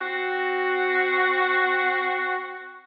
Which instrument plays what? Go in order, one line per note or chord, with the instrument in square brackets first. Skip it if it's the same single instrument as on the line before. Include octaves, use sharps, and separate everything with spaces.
[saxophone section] C4 F#4